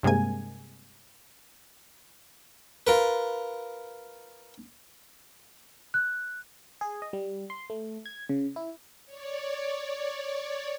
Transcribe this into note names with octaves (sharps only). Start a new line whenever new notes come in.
G2 C3 G#3 A#3 G#5
F4 A#4 B4
F#6
G#4
D#5
G3
C6
A3
G#6
C#3
E4
C#5 D5